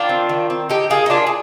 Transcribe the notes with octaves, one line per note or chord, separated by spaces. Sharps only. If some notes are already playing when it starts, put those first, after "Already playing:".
Already playing: D#3 D4 F4
C4
D#3
C4
D3 D#4 G4
A#3 F4 G#4
D#4
A#3 D4 F4
G#4